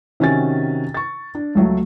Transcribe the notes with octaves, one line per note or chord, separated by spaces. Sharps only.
C3 D#3 C#4 F#4 G#5 A6
C#6 A6
D4
C#2 F#3 A3